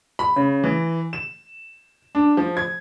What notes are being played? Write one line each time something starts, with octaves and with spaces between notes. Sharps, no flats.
B5
C#3
E3
E7
D4
F3
G#6